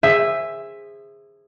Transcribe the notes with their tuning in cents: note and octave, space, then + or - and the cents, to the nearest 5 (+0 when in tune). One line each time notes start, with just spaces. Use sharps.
G#4 -20 C5 +0 E5 +5